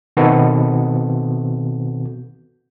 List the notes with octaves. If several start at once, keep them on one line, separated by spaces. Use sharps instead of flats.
B2 D#3 B3 C4 F#4 A4